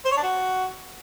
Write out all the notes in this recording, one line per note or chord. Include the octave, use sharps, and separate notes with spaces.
C5
C#5
D4
F#4